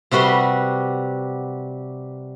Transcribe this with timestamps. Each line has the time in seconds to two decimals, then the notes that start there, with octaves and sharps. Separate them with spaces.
0.11 C3 G3 F#4 B4 C6